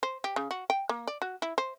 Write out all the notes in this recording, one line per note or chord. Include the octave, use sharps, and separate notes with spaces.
C5
G4
C#3
F#4
G5
A#3
D5
F#4
E4
C5